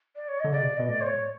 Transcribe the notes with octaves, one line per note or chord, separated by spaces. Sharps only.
D5
C#5
D3 D#5
C#3 D5
C3
B2 D#5
A2 D5
C5
C#5